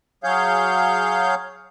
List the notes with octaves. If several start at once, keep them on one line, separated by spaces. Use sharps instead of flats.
F#3 G#4 C#5 F5 G6